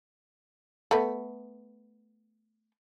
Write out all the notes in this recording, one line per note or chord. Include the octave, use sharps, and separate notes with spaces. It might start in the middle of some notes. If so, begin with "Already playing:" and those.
A3 B3